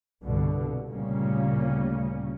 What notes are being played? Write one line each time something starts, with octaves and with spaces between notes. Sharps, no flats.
C2 G2 B2 D3
D2 A#2 C#3 G3 A#3 C#4